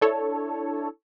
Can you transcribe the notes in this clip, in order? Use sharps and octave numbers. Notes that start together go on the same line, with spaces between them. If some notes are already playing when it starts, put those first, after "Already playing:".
D4 E4 A4 C#5